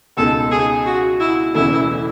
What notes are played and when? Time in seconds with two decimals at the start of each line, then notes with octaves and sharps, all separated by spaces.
0.17 C#2 B2 G#3 D#4 A4
0.51 G#4
0.86 F#4
1.20 E4
1.54 E1 E2 C#3 E3 A3 E4